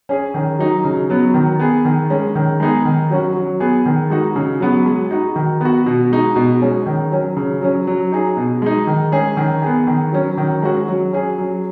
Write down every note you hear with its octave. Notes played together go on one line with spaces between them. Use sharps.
C#4 G#4
D#3
F#3 D#4 F#4
C#3
F#3 B3
D#3
B3 G#4
D#3
G#3 C#4
D#3
G#3 B3 D#4 G#4
D#3
F#3 C#4 F#4
F#3
B3 G#4
D#3
G#3 D#4 F#4
C#3
F#3 B3 F#4
G#3
D#4 F#4
D#3
B3 F#4
B2
G#3 D#4 F#4
B2
G#3 C#4
D#3
F#3 C#4
C#3
F#3 C#4
F#3
D#4 G#4
B2
G#3 D#4
D#3
G#3 C#4 G#4
D#3
B3 G#4
D#3
F#3 C#4
D#3
G#3 C#4 F#4
F#3
C#4 G#4
F#3